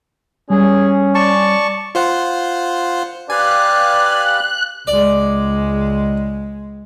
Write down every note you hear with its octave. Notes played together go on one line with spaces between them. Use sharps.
G3 C#4 G#4
D5 A5 C#6
F4 C5 F#5
G4 B4 D5 F5 G#5 F#6
C#2 G#3 D5